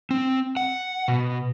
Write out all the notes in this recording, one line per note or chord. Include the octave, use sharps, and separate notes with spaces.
C4
F#5
B2